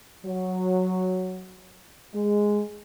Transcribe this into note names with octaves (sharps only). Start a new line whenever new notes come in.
F#3
G#3